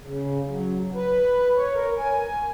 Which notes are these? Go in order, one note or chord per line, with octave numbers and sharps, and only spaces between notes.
C#3
F#3
B4
C#5
A#4
G#5